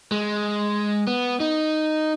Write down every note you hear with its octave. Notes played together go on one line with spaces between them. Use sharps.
G#3
B3
D#4